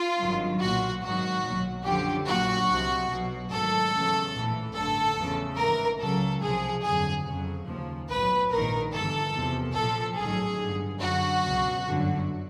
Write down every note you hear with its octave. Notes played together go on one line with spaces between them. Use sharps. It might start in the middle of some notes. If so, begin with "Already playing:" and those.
Already playing: F4
G#1 G2 D#3 F#3
B1 A#2 F#3 F#4
G#1 G#2 D#3 F#3 F#4
B1 A#2 F#3
F#2 D3 F3 G4
A#1 A#2 F#3 F#4
C2 C3 F3
B1 B2 F#3
A1 G#2 D#3 F#3 A4
E2 C#3 F#3
A#1 A2 E3
A1 G2 D3 A4
E2 C#3 F3
G#1 G#2 E3 A#4
C#2 C#3 F#3 A4
C2 C3 F3 G#4
G1 F2 D3 F#3 G#4
F2 C#3 F#3
D#2 C#3 F3
B1 A2 F#3 B4
A#1 G#2 D#3 A#4
G1 G2 E3 A4
E2 C3 F3
A#1 A#2 F3 A4
A1 G#2 D#3 F#3 G#4
G1 G2 D3
F#2 D3 F#3 F#4
C#2 B2 F#3
G1 F#2 D3 F#3